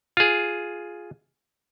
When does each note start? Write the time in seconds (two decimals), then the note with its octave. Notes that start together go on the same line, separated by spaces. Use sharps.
0.17 F4 G#4